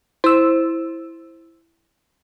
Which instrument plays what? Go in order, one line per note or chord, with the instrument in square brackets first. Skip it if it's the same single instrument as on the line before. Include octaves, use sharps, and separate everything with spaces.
[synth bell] E4 [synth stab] C5 E6